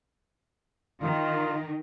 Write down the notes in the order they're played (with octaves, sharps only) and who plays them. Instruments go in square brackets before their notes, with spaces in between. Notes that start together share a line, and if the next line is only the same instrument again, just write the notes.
[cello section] D#3 [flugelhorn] F4